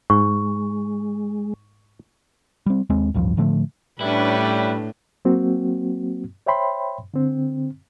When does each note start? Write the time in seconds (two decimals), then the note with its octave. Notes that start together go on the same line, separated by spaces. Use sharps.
0.10 G#2 G#3 C#6
2.66 G3 C4
2.90 D#2 G#3 C4
3.14 A1 D2 G2 F3
3.37 A2 D3 F3 A3
4.01 A2 G3 C#4 D4 E4 B4
5.25 F#3 A#3 C4 F#4
6.46 C5 C#5 E5 G5 B5 C6
7.14 D3 C4